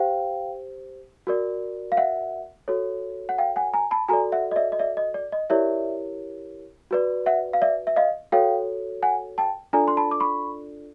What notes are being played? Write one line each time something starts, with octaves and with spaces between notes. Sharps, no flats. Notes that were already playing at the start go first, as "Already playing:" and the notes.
Already playing: G4 C5 F5 G5
F#4 A#4 D5
F5
E5 F#5
F#4 A4 C#5
F#5
F5 G5
F#5 G#5
G#5 A#5
A5 B5
F#4 A4 D5 G#5 A#5
E5 F#5
D#5
D5 E5
D#5
D5 E5
D#5
D5
D#5
E4 G4 A#4 C#5 D5 E5
F#4 B4 D5
E5 F#5
F5
D5 E5
E5
D#5 F5
F#4 A4 C#5 F5 G5
F#5 G#5
G5 A5
D4 F4 A4 D5 G#5 A#5
C6
A5 B5
D6
B5 C#6